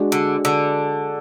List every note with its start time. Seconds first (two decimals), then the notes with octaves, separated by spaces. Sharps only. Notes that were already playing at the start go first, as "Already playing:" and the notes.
Already playing: G#3 D4 F#4
0.12 D3
0.45 D3